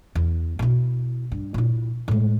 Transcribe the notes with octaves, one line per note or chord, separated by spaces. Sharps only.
E2
B2 E4
G2
A#2 E4
A2 G#3